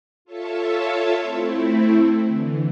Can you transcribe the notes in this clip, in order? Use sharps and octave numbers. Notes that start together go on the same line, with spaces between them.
F4 A4 C#5 E5 A5
A3 C4 E4
D3 E3